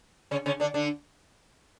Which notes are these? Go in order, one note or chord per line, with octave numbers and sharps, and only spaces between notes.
C#3 C#4
C#3 C#4
D3 D4
D3 D4